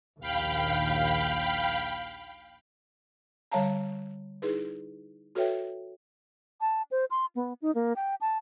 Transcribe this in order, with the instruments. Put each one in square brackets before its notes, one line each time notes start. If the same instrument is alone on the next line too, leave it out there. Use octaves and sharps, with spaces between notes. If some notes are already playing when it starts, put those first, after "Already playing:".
[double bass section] A#1 D#2 [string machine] F5 G5 B5
[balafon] D3 G3 C#5 F5 A5 A#5
D#4 E4 G#4 B4
F#4 A4 B4 C#5 E5 G5
[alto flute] A5
C5
C6
B3
D#4
A#3
G5
A5